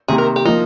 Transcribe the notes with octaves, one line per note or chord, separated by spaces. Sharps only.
C3 D#3 A#3 G#4
A#4
G4
F3 A#3 D#4